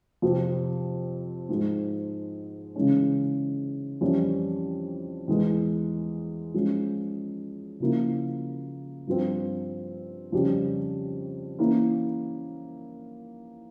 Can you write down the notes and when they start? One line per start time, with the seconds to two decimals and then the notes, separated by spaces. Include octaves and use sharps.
0.22 F2 C3 F3 C4
1.49 G#2 F3 G#3
2.75 C#3 E3 G#3 C#4
4.01 F2 E3 G3 C#4 E4
5.28 E2 E3 G#3
6.54 F3 G#3 C#4
7.80 C#3 F3 A#3 E4
9.07 G2 F3 C4
10.32 F2 C#3 G3 C#4 G4
11.59 E3 A#3 C#4 E4 A#4